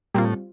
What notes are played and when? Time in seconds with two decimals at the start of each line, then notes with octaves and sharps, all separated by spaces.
0.14 A#2 G3 C4 F4
0.24 A2